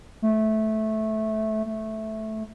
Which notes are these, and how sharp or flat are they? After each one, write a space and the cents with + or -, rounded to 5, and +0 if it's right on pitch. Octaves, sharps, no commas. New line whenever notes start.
A3 -15
A3 -10